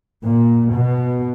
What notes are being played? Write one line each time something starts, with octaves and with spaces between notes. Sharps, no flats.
A#2
B2